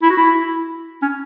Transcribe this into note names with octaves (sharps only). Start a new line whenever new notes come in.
E4
F#4
E4
C#4